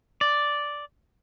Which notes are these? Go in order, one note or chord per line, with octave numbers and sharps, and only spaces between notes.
D5